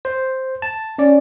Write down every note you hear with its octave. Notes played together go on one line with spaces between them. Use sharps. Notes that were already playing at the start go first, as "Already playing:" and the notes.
C5
A5
C#4 D5